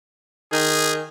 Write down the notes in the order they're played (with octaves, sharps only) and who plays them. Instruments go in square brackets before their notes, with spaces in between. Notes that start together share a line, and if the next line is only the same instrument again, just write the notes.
[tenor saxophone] D#3 [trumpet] G#4